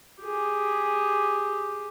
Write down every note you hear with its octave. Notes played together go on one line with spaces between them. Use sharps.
G4 G#4